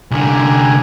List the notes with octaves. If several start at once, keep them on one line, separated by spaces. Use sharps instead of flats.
C2 D3 A#3 G4 G#5